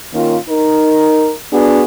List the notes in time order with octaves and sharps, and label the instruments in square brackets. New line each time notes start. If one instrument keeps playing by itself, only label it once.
[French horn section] D#3 A#3 C#4 F4
D#4 A#4
B3 D4 F#4 G#4